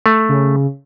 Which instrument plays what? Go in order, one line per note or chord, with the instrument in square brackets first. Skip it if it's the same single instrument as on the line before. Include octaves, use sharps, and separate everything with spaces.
[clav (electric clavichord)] A3
[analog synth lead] C#3